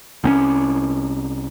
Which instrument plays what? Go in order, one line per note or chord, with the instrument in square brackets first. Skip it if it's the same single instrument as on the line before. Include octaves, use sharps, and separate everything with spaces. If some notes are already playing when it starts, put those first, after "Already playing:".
[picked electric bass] C2 C4 C#4